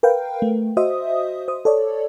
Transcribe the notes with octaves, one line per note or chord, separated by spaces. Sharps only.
A#4 B4 F5 G5
A3
F#4 C5 D#5 E5 D#6
C5 D#6
A4 C#5 D5